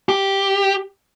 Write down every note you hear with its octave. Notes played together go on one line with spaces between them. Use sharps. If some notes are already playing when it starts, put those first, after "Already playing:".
G4